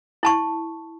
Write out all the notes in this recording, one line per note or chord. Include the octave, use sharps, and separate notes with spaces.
E4 A5 C#6